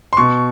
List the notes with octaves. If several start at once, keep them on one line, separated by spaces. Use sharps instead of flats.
C6
B2 C#6